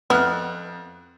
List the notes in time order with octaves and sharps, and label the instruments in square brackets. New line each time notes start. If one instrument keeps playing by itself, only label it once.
[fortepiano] F2 F6 F#6 [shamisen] B3 E4